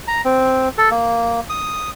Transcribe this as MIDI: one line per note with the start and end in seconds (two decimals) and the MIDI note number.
0.08 0.21 82
0.25 0.68 60
0.78 0.90 69
0.91 1.40 58
1.50 1.90 87